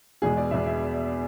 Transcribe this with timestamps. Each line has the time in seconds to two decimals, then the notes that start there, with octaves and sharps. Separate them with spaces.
0.22 E2 B2 G#3 G#4
0.37 D5
0.51 E2 B2 G#3 E5
0.66 E5